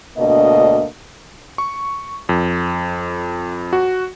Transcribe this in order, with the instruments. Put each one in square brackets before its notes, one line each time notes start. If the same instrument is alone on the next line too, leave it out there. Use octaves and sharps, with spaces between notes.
[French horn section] D2 B2 A#3 D4 D#5
[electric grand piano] C#6
F2
F#4